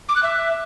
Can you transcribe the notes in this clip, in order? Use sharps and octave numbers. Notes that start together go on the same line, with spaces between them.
D6
F#6
E5